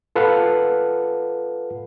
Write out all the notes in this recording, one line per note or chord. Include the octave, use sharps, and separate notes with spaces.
F4 A4 B4 F5 F#5